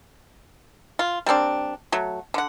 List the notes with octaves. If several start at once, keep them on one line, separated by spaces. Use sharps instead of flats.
F4
G3 A#3 C4 D4
F#3 A3
D3 F#5